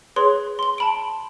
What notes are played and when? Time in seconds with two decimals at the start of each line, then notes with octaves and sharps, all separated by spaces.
0.16 G#4 B4 C#5 C6
0.59 C6 G7
0.78 A5 B5 D7